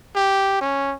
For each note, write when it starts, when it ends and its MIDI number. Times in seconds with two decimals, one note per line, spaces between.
0.15 0.60 67
0.61 0.95 61